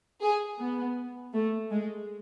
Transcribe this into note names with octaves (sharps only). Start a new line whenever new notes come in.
G#4
B3
A3
G#3